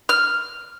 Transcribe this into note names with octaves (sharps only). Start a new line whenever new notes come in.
F6